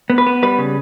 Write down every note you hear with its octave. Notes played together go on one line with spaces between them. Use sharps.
B3
B4
B3
G3 B4
C#3